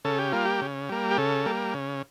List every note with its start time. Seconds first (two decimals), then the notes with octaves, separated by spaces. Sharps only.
0.05 C#3 A4
0.19 G4
0.32 G3 A#3 F4
0.45 G4
0.61 C#3
0.89 G3 A#3
1.11 G4
1.18 C#3 A4
1.46 G3 A#3
1.74 C#3